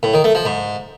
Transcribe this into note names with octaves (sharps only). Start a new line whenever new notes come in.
A2
D#3
A3
F3
G#2